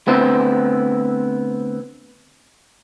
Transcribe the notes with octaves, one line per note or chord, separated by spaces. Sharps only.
D2 B3 C4 E4